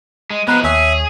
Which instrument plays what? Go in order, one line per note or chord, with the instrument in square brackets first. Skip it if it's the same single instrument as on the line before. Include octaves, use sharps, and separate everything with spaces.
[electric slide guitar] G#3
[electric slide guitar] F3 G#3 [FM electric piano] B3 A#5 C7 [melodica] B4
[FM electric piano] D#2 C#5 G#5 [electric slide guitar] G#4 [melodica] E5